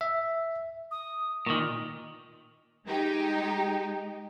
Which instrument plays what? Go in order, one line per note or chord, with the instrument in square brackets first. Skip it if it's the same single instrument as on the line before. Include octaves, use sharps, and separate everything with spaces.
[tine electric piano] E5
[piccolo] D#6
[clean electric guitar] A#2 D#3 [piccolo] C#6
[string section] G#3 D#4 G4